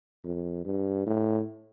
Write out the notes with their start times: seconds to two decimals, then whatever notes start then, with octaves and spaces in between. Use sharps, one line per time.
0.25 F2
0.65 G2
1.06 A2